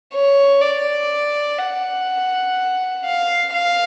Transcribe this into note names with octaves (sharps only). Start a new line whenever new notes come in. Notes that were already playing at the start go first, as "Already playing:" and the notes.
C#5
D5
F#5
F5
F5